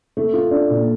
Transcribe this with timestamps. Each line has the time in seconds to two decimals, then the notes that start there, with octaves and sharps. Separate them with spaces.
0.17 A3
0.33 F4
0.51 D4
0.70 A#2